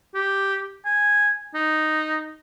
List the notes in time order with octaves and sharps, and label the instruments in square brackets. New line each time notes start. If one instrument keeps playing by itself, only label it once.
[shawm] G4
G#5
D#4